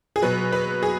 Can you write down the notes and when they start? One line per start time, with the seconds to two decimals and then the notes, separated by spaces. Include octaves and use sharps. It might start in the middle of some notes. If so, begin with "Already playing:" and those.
0.16 G#4
0.22 B2 F#3 B4
0.52 B4
0.83 G#4